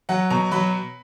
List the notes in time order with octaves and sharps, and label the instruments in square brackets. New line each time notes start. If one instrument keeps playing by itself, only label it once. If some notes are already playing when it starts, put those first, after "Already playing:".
[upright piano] F#3 F#5
B2 A#5
F#3 B5